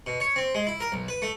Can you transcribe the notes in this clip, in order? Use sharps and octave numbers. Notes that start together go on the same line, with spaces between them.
B2
C#5
C4
G#3
E4
A#4
B1
B4
A3